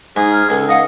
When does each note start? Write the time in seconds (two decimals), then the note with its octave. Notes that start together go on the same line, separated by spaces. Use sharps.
0.16 G#2 D#4 G#4
0.32 F6
0.50 C#2 A4
0.69 D#5 F5 F#5